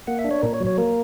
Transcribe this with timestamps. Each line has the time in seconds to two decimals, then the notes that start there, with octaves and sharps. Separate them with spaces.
0.07 A#3 F#5
0.19 E5
0.24 D4
0.31 C#5
0.42 A#2 A#4
0.54 C#5
0.60 F#3
0.66 C#5
0.78 A#3 A#4